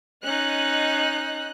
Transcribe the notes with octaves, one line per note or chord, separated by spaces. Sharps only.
C#4 D#4 D#5 F#6